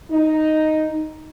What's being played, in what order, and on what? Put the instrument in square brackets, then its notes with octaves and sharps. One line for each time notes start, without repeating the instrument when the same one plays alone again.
[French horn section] D#4